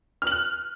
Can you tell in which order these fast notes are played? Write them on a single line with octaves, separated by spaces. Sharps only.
F6 F#7 F#6